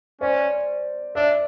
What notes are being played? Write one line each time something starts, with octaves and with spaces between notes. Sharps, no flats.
C#4 C5 D5
D4 D5 E5